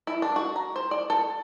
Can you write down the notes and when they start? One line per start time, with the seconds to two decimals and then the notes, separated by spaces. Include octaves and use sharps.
0.07 E4
0.22 D4
0.36 F#4
0.56 A#5
0.76 C5
0.91 D5
1.10 A4